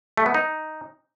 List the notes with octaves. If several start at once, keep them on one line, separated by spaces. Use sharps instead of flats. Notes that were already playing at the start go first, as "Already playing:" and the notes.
A3
B3
D#4